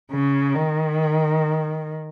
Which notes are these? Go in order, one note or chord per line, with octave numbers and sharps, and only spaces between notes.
C#3
D#3